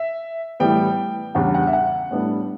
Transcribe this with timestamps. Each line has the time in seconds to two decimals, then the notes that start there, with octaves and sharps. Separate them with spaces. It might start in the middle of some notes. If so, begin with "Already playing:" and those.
Already playing: E5
0.60 A2 E3 G3 B3 G5
1.35 E2 C#3 G3 D4 F#5
1.54 F#5
1.67 E5
1.73 F#5
2.11 A2 G3 B3 D4